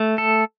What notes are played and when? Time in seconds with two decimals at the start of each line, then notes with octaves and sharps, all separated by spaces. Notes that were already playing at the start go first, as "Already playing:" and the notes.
Already playing: A3
0.18 A4